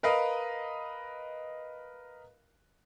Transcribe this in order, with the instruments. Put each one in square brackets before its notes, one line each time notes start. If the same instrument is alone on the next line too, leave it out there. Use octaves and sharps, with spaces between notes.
[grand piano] A#4 B4 D#5 F5